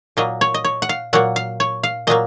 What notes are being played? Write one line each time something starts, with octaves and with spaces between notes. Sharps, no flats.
A#2 F#3 A#3 D#5
C#5
D#5
C#5
F#5
F5
A#2 F#3 A#3 F#5
F5
C#5
F5
A#2 F#3 A#3 D#5